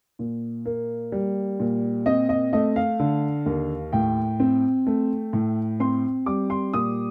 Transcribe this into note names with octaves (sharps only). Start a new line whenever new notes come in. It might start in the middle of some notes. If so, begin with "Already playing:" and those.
A#2
A#3
G3
A#2
C4 D#5
D#5
A3 D#5
F5
D3
D#2
A2 G5
C4
A3
A2
C4 C6
G3 D6
C6
A#2 D#6